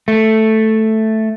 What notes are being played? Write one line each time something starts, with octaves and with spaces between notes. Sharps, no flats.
A3